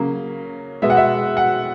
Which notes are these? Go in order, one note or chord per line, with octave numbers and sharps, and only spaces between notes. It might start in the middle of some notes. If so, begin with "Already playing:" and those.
Already playing: C#3 F#3 A#3 C#4
B2 G#3 B3 E5
F#5
E5
F#5